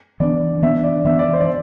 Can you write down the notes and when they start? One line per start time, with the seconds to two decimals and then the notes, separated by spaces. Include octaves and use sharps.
0.20 E3 B3 D4 D5
0.62 E3 B3 D4 E5
0.84 D5
1.05 E3 B3 D4 E5
1.19 D5
1.33 C5
1.41 D5